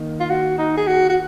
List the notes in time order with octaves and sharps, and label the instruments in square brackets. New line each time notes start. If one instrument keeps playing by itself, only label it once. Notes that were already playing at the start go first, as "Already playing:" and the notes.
Already playing: [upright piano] D#3 A#3 D#4
[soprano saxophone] F4
F#4
D#4
G#4
F#4
F#4